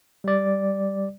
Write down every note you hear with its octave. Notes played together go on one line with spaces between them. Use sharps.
G3 D5